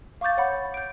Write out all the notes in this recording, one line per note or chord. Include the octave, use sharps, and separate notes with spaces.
F5 C#6 D6 G6 A6
C#5 F#5 B5
G6 D7